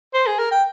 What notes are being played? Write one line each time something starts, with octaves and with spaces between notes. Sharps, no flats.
C5
G#4
A#4
G5